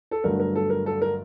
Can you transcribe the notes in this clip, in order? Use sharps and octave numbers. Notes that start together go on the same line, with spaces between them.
A4
G1 G2 D3 F#3 A3 A#4
A#4
A4
A#4
A4
A#4